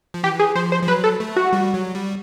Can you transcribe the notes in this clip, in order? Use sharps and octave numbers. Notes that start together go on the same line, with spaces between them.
F3
E3 G4
G#4
F3 C5
C5
F3
F#3 B4
A4
A3
F#4
G3
F#3
G3